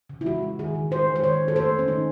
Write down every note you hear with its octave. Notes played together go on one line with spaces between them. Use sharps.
C#3
E4
G#3 F#4
G#3
D#3 G#4
D#3
G#3 C5
G#3
C5
D#3 C#5
D#3
A4
A3 C5
A3
C#4
D#3 D#4